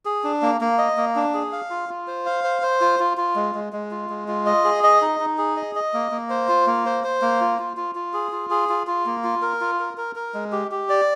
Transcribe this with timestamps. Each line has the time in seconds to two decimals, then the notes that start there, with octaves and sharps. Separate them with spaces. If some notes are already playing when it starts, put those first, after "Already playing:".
0.05 G#4
0.24 D4
0.42 A#3
0.61 A#3
0.78 D#5
0.97 A#3
1.16 D4
1.34 G#4
1.52 F5
1.70 F4
1.89 F4
2.07 C5
2.26 F5
2.44 C5
2.62 C5
2.81 F4
2.99 F4
3.17 F4
3.36 G#3
3.55 G#3
3.73 G#3
3.91 F4
4.10 G#3
4.28 F4
4.46 D#5
4.64 G#4
4.84 D#5
5.01 D#4
5.20 D#4
5.38 G#4
5.56 D#5
5.75 D#5
5.94 A#3
6.11 A#3
6.30 C5
6.49 F4
6.67 A#3
6.86 C5
7.04 C5
7.22 A#3
7.40 F4
7.59 F4
7.77 F4
7.95 F4
8.13 G#4
8.32 F4
8.50 G#4
8.69 F4
8.87 F4
9.06 A#3
9.24 F4
9.42 A#4
9.61 F4
9.79 A#4
9.97 A#4
10.16 A#4
10.34 G#3
10.52 G4
10.71 G4
10.89 D5